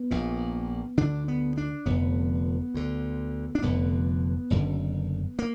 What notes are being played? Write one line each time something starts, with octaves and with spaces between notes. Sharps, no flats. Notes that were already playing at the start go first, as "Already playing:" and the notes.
Already playing: B3
A#1 A#2
D2 D3 D4
B3
D4
F1 F2 D3 B3
D2 D3
D4
F1 F2 D3 B3
F#1 F#2 D3
A#3